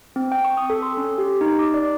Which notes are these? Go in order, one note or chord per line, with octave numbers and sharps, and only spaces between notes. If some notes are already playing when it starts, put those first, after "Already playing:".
C4
G5
C#6
D#6
A4
C6
C#4
G4
D#4
D6
D5